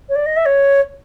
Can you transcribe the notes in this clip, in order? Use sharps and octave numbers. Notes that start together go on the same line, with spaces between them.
C#5
D5
D#5
E5
C#5